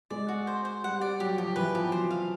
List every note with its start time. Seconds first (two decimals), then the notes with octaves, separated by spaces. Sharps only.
0.10 G#3 D5
0.29 F#4
0.47 C5
0.65 C5
0.84 G3 F#5
1.01 D5
1.20 F#3 G4
1.38 F3 G4
1.56 E3 B4
1.75 F3 G4
1.92 F#3 C5
2.10 F5